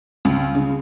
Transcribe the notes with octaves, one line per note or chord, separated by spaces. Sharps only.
C#2
C#3